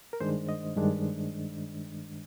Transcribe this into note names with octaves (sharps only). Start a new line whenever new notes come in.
A#4
G2 D#3 G#3 D4 C5
D#5
G2 D#3 G#3 D4